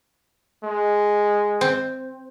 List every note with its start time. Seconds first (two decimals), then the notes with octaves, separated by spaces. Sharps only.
0.64 G#3
1.61 C4